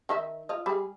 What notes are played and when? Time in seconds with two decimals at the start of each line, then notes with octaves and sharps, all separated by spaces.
0.09 D#3 D#5 E5
0.49 F4 D#5
0.66 G3 G#4